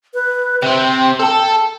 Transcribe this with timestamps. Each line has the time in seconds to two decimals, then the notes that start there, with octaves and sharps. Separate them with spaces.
0.14 B4
0.62 C3 C4 G5
1.19 A4 A5